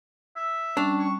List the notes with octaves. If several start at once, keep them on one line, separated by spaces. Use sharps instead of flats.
E5
G3 C#4 D4 A5
C#6